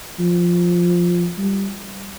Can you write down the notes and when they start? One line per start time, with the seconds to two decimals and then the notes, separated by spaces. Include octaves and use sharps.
0.19 F3
1.38 G3